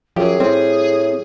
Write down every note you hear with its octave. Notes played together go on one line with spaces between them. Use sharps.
F#2 F3 G4 G#4
A2 G3 C4